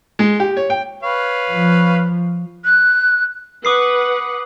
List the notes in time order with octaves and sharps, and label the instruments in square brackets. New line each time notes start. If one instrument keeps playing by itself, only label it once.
[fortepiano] G#3
G4
C#5
G5
[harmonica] B4 C#5 F5
[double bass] F3
[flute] F#6
[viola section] B4 F#5 [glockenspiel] D6 D#6 C7